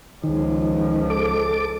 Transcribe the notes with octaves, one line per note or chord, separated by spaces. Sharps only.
C#2 D#3 F3
A4 D6